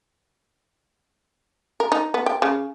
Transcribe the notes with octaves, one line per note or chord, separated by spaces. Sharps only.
A#4
D#4
B3
G5
C#3